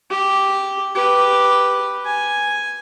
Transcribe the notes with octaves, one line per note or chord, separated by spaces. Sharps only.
G4
G4 B4
G#5